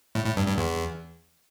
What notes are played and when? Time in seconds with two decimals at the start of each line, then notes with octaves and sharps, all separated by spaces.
0.15 A2
0.26 A2
0.37 G2
0.47 G2
0.58 E2